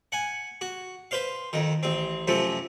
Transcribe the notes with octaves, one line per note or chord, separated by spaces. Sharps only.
F#5 G#5
F#4
B4 C5 F5
F2 D#3
A1 C4
F#2 C3 F3 A3